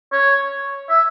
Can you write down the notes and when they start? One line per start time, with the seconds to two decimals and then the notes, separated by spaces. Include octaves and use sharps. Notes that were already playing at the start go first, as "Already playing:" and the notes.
0.12 C#5
0.90 E5